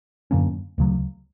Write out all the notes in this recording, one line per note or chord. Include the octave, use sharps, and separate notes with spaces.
F#2 D3 A#3 C#4
D2 C#3 F#3